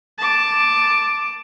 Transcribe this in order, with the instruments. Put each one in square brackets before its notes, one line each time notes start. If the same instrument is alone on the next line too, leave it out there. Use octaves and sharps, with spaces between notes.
[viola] A5 D6